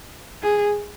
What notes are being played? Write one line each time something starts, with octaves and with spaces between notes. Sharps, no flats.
G#4